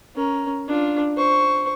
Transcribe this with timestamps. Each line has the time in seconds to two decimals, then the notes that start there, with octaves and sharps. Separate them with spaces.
0.15 C#4 A#4
0.67 D4 F4
1.16 C5 C#6